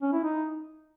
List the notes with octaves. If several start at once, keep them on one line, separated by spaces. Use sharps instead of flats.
C#4
E4
D#4